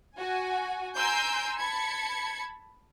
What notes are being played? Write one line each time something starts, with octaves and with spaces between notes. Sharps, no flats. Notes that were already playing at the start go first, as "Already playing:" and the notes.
F#4 G#5
G#5 A#5 C6 E6 G6 D7
A5 B5 G#6 C#7